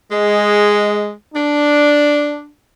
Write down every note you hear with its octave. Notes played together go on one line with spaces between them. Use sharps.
G#3
D4